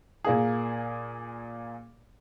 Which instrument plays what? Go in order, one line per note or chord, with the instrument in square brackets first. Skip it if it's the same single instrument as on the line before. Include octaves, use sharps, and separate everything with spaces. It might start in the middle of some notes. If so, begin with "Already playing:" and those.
[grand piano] A#2 A#3 G#4